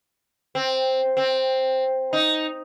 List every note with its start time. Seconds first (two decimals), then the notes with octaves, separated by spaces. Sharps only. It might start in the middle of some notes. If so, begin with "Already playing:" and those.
0.55 C4
1.17 C4
2.13 D#4